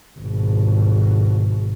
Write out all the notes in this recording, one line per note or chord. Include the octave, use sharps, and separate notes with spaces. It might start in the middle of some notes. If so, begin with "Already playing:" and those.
G#1 B2